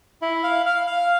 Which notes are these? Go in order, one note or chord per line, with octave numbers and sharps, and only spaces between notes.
E4
F5
F5
F5